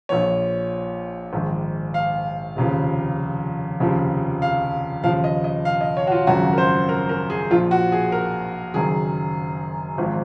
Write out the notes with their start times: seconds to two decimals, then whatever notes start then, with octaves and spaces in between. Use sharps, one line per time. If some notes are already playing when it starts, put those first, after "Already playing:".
0.09 A#1 A#2 F3 C#5
1.33 A#1 G#2 D#3
1.94 F5
2.56 F1 D#2 C#3 F3
3.80 F1 D#2 C#3 F3
4.42 F5
5.04 D#2 C#3 F3 F5
5.24 D#5
5.44 D#5
5.65 F5
5.81 D#5
5.97 C#5
6.07 F#4
6.12 F4
6.27 G#1 F#2 C#3 F3 F#4
6.53 A#4
6.58 C5
6.89 A#4
7.09 A#4
7.30 G#4
7.50 A#1 A#2 F3 F4
7.71 F#4
7.92 G#4
8.12 A#4
8.74 F#1 F#2 D#3 G#4
9.98 G#1 G#2 F3